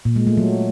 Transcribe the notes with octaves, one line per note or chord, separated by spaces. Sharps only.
A#2
G#3
A3
F#3